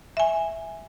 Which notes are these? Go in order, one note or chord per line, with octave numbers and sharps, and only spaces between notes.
E5 G#5